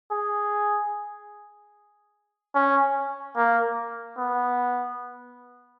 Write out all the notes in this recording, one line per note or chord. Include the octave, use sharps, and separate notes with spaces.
G#4
C#4
A#3
B3